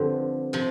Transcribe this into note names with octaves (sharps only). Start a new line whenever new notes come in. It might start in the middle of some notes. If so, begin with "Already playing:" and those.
Already playing: G2 D3 F3 C4
C3 F3